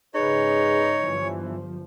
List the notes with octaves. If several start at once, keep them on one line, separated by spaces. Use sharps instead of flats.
G#2 C#3 D#4 G#4 B4 C#5
G1 E3 F3